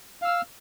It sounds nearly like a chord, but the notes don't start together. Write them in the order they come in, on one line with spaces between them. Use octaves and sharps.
F5 E6 F6